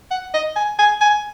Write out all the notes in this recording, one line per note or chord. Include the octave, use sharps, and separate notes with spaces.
F#5
D#5
G#5
G#5
G#5